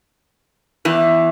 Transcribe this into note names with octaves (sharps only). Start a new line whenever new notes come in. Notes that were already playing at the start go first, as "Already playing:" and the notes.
E2 E3